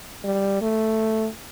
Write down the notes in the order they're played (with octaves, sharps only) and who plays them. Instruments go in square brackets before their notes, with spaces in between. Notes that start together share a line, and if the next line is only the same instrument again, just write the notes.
[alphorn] G3
A3